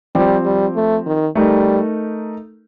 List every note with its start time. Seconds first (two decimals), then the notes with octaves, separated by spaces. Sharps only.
0.15 F3 G3 C4 G4
0.45 G3
0.76 A3
1.06 D#3
1.35 G3 A3 D#4 A#4